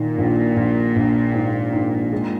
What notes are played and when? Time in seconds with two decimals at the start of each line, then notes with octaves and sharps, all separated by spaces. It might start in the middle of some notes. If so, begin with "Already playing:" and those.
Already playing: A#2 D#3
0.18 A#1
0.56 A#1
0.96 A#1
1.34 G#2
1.73 G#2
2.12 G#3